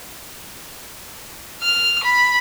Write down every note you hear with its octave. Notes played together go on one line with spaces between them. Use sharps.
F6
B5